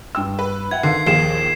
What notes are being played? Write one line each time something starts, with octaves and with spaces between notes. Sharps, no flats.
G2 G5 E6
B4
E5 F#5 G5 G#6
D3 D#3 F5 C6 C7
A#1 D#2 G#4 A#4 F5 C7 E7